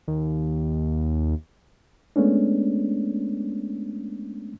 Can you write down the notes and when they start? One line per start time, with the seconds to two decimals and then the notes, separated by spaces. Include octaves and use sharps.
0.08 D#2
2.16 G#3 A3 B3 C#4 D4